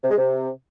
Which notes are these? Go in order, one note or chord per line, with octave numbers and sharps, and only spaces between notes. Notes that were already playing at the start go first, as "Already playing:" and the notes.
C3
G#3
C3